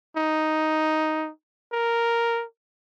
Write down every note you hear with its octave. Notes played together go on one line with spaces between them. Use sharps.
D#4
A#4